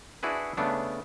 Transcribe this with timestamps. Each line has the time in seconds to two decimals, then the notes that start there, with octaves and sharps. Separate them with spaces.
0.23 D4 E4 F#4 G#4 B4
0.57 C#3 A3 B3 D4